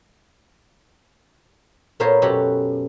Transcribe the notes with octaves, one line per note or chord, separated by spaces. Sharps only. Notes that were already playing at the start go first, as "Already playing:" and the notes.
A#2 B3 F4 A#4 C5 C#5
F#2 B2 G4 A4 C#5 F#5